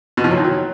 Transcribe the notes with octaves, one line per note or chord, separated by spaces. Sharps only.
B2
F3
F#3
D#3
F#3